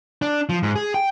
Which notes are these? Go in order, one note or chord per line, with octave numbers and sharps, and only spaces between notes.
D4
F3
G#2
G#4
G5